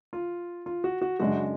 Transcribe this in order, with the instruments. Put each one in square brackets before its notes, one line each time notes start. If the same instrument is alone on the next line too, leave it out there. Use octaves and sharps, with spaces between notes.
[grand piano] F4
F4
F#4
F#4
[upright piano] F#2 C#3 G#3 D4 [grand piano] F#4